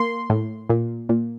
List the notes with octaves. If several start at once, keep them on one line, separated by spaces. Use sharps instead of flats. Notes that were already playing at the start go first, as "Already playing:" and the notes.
Already playing: A#3 C6
A2
A#2
A#2